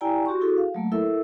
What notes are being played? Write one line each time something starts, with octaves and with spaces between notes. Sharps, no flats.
E4 G4 D5 G5 G#5 A#5
F#4 G4 C6 C#6
E4 F#4 G#4 A4
F5
F#3 A3 A#3
E4 A4 A#4 E5 E6